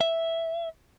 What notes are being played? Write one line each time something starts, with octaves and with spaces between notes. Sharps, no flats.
E5